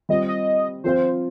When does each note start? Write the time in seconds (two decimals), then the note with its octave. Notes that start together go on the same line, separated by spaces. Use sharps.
0.09 G3 C4 F4 D#5
0.28 D#5
0.84 F3 C4 F4 C5